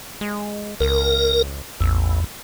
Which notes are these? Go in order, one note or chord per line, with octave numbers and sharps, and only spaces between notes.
G#3
C#2 A#4
A1 E2